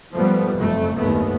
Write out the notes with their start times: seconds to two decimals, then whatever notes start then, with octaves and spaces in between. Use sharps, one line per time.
0.16 G#2 F3 G3 A3 B3
0.55 F#1 F2 A3
0.96 F#1 D#2 G#2 A3 B3